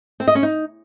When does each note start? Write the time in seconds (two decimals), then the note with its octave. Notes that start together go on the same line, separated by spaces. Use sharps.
0.20 C4
0.28 D#5
0.35 C#4
0.43 D#4